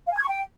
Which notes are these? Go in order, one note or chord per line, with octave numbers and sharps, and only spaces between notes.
F5
G#5
G#6
C#6
G5